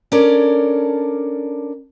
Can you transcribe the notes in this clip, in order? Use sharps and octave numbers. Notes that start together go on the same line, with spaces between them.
C#4 D4 A4 A#4 C#5 D5